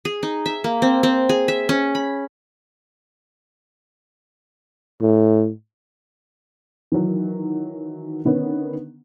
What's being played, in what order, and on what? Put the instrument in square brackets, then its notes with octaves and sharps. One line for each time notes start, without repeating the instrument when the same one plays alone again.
[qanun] G#4
D#4
E5
A#3
C4
C4
G#4
E5
C#4
B5
[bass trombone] A2
[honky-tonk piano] D#3 E3 F#3
D3 D#3 B3 C#4